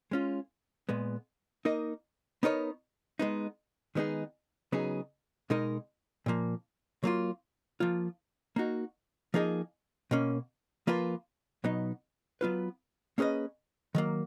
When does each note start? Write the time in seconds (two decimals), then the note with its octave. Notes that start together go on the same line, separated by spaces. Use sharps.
0.11 G#3 C#4 F4
0.89 A#2 G#3 B3
1.65 A#3 D#4 A#4 D#5
2.43 B3 D#4 A#4 C#5
3.19 G#3 B3 D#4
3.95 D#3 G#3 B3 D#4 G#4
4.72 C#3 F#3 B3 D#4 G#4
5.50 B2 G#3 D#4 A#4
6.26 A#2 F3 A#3
7.04 F#3 A#3 F4
7.80 F3 A#3 F4
8.56 A#3 D#4 F#4
9.34 F3 A#3 D#4 G#4 D#5
10.11 B2 A#3 C#4
10.87 F3 A#3 F4 B4
11.64 B2 F#3 B3 D#4
12.41 F#3 B3 F4 B4
13.18 A#3 C#4 G#4 B4 D#5
13.95 D#3 F#3 A#3